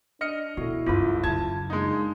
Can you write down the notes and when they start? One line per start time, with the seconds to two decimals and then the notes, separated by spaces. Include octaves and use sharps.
0.21 D4 D#5 F6 C#7
0.57 B2 E4 F#4 A4
0.87 F#1 C#2 G2 F4 B5 D6
1.23 F#2 C#3 A5 G#6
1.70 G#3 A#3 D4 D#4